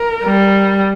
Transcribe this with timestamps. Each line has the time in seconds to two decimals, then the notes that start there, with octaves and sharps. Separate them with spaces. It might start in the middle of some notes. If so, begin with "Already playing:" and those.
Already playing: A#4
0.24 G3